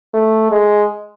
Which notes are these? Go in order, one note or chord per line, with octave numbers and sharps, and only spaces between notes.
A3
G#3